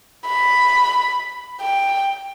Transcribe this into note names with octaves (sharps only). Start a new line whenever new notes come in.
B5
G5